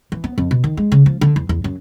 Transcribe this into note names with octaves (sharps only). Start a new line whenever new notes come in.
E3
B3
F2
B2
D#3
G#3
C#3
F3
D3
E2
E2
F#2